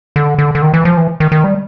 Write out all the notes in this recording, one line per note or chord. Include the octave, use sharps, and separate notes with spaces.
D3
D3
D3
D#3
E3
F3
E3
D#3
D#3
G3